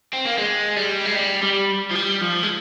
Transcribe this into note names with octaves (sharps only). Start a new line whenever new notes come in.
C4
A#3
G#3
G3
G#3
G3
G3
F3
G3
F3
G#3